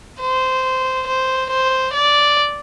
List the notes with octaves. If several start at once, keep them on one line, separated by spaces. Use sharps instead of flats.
C5
C5
C5
D5